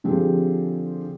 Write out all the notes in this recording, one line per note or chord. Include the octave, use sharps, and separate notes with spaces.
D3 F3 C4 G4 G#4